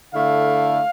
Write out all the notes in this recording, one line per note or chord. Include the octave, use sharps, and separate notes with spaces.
D3 A3 E4 F5